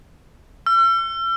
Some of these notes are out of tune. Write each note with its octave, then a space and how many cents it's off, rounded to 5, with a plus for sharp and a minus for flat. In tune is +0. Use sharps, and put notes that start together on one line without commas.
E6 +45